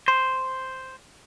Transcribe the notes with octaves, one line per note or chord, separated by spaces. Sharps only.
C5